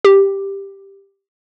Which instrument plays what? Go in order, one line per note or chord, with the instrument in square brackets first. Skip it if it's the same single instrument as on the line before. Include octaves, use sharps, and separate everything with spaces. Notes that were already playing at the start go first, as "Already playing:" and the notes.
[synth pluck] G4